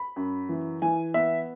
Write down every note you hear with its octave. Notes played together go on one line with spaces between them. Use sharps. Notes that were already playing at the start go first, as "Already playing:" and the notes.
Already playing: B5
F#2
E3
E3 G#5
B3 E5